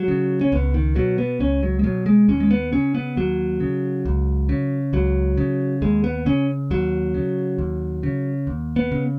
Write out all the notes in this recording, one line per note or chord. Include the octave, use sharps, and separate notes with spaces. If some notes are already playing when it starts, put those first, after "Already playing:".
Already playing: F#3
C#3
C#4
C#2 B3
D#3
B2 F#3
B3
C#2 C#4
F#3
G#3
B2 F#3
G#3
D#2 C#4
G#3
B3
C#3 C#4
B3
D#2 F#3
C#3
C#2
C#3
C#2 F#3
C#3
D#2 G#3
B3
C#3 C#4
D#2 F#3
C#3
D#2
C#3
D#2
B3
C#3